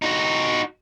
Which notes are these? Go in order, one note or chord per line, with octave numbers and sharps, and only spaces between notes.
D#4 F#4